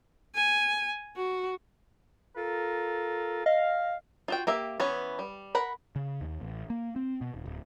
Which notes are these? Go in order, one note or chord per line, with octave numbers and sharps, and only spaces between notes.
G#5
F#4
F4 A4 A#4
D#5 F5
F4 F#4 G5
A#3 G4 E5
E3 B3 C#4 C#5
G3
A#4 F#5 B5
C#3
D#2
A1
A#3
C4
B2
D#1
D1